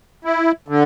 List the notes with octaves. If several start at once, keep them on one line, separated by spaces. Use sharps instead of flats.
E4
D3